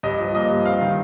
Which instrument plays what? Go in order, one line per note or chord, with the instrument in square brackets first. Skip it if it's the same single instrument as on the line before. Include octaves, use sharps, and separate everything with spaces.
[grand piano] G2 D#5
F3
A#3 D#5
G2
C4 F5
D#3